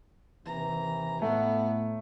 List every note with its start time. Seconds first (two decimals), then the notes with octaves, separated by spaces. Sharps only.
0.46 D#2 C3 E3 A#5
1.22 A2 A3 B3